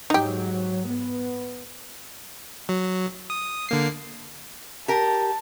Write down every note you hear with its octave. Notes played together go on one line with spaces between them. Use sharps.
G#2 F#3 D#4 G4
B3
F#3
D#6
D3 A#3 C7
G4 A#4 A5